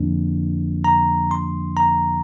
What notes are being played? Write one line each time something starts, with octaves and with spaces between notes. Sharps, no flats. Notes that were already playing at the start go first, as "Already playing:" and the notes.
Already playing: F2 D3 F3 A#3 D4
A#5
C6
A#5